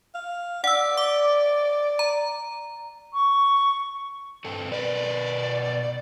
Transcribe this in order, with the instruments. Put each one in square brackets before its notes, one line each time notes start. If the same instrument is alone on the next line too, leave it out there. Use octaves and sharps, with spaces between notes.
[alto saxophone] F5
[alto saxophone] D5 [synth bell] F#5 E6
[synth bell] D6
A#5
[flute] C#6
[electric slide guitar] G2 C4 A4
[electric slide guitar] B2 A#4 B4 [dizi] D5